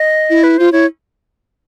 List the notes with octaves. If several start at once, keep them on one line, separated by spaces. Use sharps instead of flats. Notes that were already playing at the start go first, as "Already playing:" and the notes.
Already playing: D#5
E4
B4
F4 C5
E4 C#5